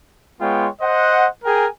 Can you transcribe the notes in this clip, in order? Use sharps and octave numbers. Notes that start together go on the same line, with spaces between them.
G#3 B3 F4 C#5 G5
C5 D#5 F#5
G#4 A#4 G5 G#5